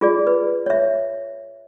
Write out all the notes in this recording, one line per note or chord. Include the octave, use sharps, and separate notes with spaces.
F4 G#4 D5
B4
C#5 E5